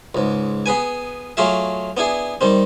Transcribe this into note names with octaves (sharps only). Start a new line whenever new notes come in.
C#2 G#2
B3 G#4 B4 G#5
F#3 A3 F4 G#4 E5
B3 D4 E4 G#4
D#3 G3 C4